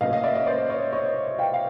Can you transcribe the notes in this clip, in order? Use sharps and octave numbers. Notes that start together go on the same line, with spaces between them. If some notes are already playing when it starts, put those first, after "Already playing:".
A2 F#3 A#3 C#4 D#5 F5
D#5 F5
D5 E5
C#5 D#5
C5 D5
C#5 D#5
C#5 D#5
F5 G5
F5